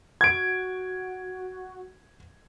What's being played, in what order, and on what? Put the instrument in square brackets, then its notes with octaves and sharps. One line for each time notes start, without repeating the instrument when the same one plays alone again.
[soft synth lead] F#4 [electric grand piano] G#6 D7